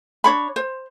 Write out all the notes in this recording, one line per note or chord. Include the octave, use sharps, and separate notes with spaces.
D4 C#5 B5
C5